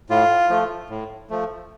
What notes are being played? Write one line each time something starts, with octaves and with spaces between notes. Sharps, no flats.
A2 F4
F3 A3
A2
F3 A3